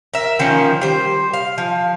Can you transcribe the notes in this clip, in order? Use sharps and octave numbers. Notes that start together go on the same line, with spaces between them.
A#4 E5
D#3 F3 A#3 C#4
G3 C5
F5
F3